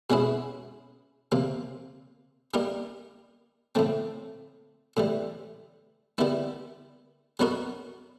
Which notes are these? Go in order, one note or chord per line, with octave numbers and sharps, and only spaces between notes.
B2 G#3 C#4 E4 G#4
C3 F3 A#3
G3 A#3 D#4 G4 A#4
A2 F3 A3 C4
A2 E3 G3
D#3 G3 B3 E4
F#3 B3 D#4 F#4 A#4